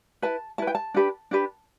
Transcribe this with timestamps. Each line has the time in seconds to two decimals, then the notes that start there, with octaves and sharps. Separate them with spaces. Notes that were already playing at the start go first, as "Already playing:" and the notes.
0.22 E4 B4 A5
0.58 E4 B4 A5
0.67 G5
0.75 A5
0.94 D4 G4 B4
1.31 D4 G4 B4